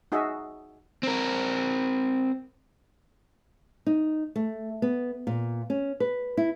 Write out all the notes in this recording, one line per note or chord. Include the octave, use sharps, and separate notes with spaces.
D#4 F#4 G#4 D#5 E5
C4 A#4
D#4
A3
B3
A#2
C#4
B4
E4